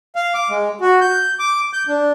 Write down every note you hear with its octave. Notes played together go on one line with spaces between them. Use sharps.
F5
D6
G#3
F#4
G6
D6
G6
D4